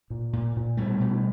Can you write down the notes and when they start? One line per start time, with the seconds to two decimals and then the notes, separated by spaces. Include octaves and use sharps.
0.10 A#2
0.33 A#2
0.56 A#2
0.77 B2 G3 A3
1.00 B2